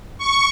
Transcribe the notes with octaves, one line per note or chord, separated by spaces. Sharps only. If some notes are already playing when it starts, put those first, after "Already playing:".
C#6